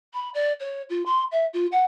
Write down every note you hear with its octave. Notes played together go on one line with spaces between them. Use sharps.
B5
D5
C#5
F4
C6
E5
F4
F#5